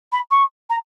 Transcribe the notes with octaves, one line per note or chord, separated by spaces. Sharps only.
B5
C#6
A#5